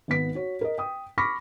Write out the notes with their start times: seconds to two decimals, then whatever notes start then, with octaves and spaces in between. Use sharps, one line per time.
0.08 G#1 B3 B6
0.35 F#4 C#5
0.61 A#4 D#5
0.78 G5 D#6
1.18 B5 C#6 D6 F6 A#6 B6